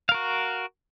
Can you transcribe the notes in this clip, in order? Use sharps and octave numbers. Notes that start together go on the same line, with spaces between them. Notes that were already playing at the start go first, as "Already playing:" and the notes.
F#4 A#4 F5